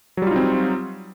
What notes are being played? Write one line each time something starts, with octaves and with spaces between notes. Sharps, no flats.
F#3 G3 C4 D#4 F4